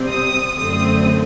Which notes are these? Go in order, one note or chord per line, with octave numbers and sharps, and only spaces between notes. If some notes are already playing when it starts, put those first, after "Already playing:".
Already playing: C3 G3 C4
D#6
F#2 D3 A3 C4 D#6